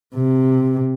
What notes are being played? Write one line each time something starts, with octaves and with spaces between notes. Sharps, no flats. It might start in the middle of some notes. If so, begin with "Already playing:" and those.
C3